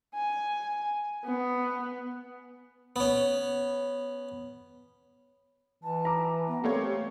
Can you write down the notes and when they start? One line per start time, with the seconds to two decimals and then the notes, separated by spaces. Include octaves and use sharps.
0.15 G#5
1.25 B3
2.96 B3 C#4
5.83 E3 A5
6.05 A#5 D6
6.48 B3
6.64 A3 A#3 C4 G4 C#5